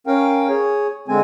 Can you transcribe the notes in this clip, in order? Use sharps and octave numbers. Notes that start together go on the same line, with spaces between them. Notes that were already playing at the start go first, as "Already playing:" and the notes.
C#4 A#4 F5 G5
G#4 C#5
D3 G#3 C4 G#5